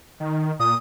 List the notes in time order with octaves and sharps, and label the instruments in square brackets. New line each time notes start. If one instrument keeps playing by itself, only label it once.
[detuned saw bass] D#3
[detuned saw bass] A#2 [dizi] D#6